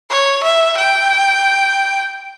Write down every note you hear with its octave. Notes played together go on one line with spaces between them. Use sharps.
C#5
E5
G5